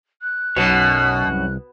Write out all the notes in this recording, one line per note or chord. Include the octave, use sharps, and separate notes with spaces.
F#6
B1 F#2 B2 F#4 C#5
C2